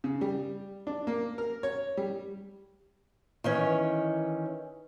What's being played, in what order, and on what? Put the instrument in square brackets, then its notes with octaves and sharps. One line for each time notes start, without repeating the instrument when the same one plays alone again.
[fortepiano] C#3
G3
D4
A#3
A#4
C#5
G3
[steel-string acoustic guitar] D#3 E3 C#4